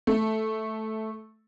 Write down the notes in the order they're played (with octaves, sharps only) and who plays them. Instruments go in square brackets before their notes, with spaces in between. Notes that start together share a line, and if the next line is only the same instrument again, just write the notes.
[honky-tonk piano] A3